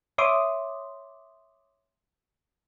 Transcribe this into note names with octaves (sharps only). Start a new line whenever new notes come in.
C#5 E5 C6 D6 D#6